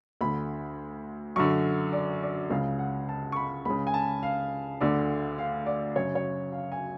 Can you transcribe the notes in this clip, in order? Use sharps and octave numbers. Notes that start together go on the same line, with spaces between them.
D2 D3 B5
F#2 D3 C#6
D5
D5
C#2 C#3 F5
F#5
A5
C#6
B5
C#2 C#3 B5
G#5
A5
F5
D2 D3 D5
F5
D5
F#2 C#3 C#5
C#5
F5
G#5